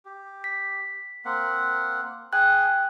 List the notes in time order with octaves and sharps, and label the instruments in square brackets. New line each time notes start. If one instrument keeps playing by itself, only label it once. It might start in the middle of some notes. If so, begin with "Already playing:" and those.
[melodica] G4
[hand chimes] B6
[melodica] A#3 C4 F#5
[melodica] G#4 G#5 [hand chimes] G5 F#6